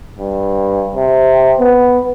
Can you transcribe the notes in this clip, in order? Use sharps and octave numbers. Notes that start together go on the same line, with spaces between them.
G2
C3
B3